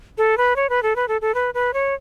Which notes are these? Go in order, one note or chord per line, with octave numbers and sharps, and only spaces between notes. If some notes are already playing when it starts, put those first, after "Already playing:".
A4
B4
C#5
B4
A4
B4
A4
A4
B4
B4
C#5